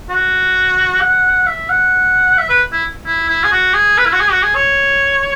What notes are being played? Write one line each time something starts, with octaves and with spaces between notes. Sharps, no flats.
F#4
F#5
E5
F#5
E5
B4
E4
E4
E4
G#4
F#4
G#4
B4
E4
F#4
G#4
F#4
G#4
C#5